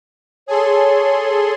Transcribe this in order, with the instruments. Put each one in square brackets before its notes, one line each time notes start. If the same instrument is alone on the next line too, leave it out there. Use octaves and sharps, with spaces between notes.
[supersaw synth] G#4 A4 C6 [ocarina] C#5